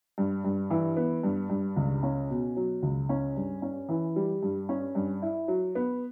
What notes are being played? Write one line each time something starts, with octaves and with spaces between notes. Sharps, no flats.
G2
G2
E3
B3
G2
G2
C#2
C#4
B2
F#3
C#2
C#4
G2
C#4
E3
G3
G2
C#4
G2
E4
F#3
B3